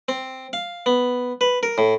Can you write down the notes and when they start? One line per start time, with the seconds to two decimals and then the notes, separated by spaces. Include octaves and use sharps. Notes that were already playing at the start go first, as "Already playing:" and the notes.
0.08 C4
0.53 F5
0.86 B3
1.41 B4
1.63 A#4
1.78 A2